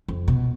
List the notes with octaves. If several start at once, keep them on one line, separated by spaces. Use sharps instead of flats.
F2
B2